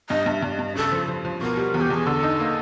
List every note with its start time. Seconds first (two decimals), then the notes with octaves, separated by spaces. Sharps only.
0.10 G2 D#5
0.26 G2
0.31 E5
0.42 G2 D5
0.53 D#5
0.59 G2
0.76 C#3 A4
0.92 F3
1.08 F3
1.25 F3
1.41 B2 A#4
1.57 G3
1.74 E2
1.81 G4
1.90 E2 G#4
2.06 D3 A4
2.23 D#4
2.40 A#3